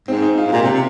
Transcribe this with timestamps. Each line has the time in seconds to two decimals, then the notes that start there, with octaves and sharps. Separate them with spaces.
0.08 G#2 C4
0.22 D#4
0.38 F4
0.45 G#2
0.53 A#2 G4
0.62 C3
0.73 C3